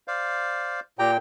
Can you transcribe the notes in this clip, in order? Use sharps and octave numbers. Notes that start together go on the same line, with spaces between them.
C5 D5 F5
A#2 G4 G5 A#5